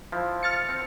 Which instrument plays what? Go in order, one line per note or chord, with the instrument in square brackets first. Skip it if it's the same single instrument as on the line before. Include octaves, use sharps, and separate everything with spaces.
[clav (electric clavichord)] F3 E4
[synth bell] F6 A6 C#7
[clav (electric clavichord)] C4